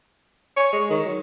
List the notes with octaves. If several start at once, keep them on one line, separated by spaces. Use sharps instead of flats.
C#5
G#3
D#3
F#3